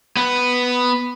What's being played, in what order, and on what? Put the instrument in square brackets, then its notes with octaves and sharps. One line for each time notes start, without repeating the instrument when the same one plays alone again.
[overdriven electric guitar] B3